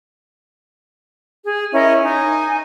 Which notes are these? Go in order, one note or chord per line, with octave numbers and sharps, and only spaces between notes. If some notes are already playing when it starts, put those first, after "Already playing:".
G#4
C#4 E4 A#4 D#5
D#4 G#5